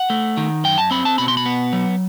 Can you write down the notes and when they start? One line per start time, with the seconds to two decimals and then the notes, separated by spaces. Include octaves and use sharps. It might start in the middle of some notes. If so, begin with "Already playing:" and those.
Already playing: F#5
0.10 A3
0.37 D#3
0.64 F#2 G5
0.78 A5
0.91 C4 B5
1.05 A5
1.18 B2 B5
1.28 C6
1.37 B5
1.45 B3
1.73 F#3